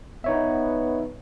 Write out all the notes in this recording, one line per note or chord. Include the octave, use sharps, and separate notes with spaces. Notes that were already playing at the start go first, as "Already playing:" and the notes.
B3 D#4 C#5 E5